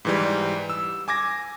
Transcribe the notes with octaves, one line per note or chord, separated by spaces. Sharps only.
G#2 E3 G3
E6
G#5 D6 G#6 A#6